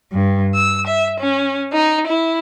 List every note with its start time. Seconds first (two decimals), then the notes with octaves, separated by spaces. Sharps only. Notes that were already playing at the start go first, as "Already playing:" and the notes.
0.12 G2
0.54 E6
0.87 E5
1.20 C#4
1.73 D#4
2.07 E4